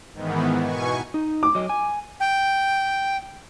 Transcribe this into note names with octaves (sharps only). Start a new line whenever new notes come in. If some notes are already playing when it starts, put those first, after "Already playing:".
G#2 D#3 E3 B3
B2 G#5 C#6
D#4
D6
F#3 D#5
G#5
G5